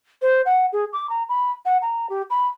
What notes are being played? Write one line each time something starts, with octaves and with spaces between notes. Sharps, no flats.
C5
F#5
G#4
D6
A#5
B5
F#5
A#5
G4
B5